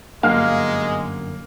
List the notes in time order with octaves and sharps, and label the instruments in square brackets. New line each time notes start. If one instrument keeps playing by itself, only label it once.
[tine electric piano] G1 F#2 [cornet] G#3 [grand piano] A#3 [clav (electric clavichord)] F5